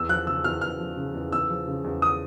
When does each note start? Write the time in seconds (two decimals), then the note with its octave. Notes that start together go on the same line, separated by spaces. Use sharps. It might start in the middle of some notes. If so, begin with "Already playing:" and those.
Already playing: E2 E6
0.09 F3 F#6
0.27 C#3 E6
0.44 E2 F6
0.61 E2 F6
0.79 F3
0.97 C#3
1.14 E2
1.32 E2 E6
1.50 F3
1.67 C#3
1.84 E2
2.02 D#6